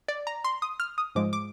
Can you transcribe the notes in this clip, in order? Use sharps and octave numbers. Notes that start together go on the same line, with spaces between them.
D5
A#5
C6
D#6
F6
D#6
G#2 F3 G#3 D6
D6